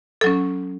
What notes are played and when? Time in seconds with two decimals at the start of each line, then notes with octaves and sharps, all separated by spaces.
0.21 A4
0.24 F#3
0.26 C#4